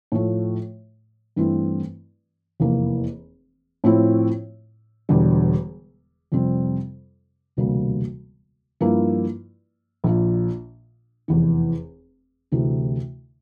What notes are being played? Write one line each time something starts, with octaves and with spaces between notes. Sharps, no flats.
A2 F3 A3
G2 E3 A3 C4 E4
F1 E2 E3 A#3
A2 F3 C4 E4
E1 E2 D3 G3
F2 C3 G3 C4
E1 D2 C3 G3 A#3
G2 F3 A#3 E4
A#1 A#2 F3
F1 E2 E3
D2 C3 E3 A3 E4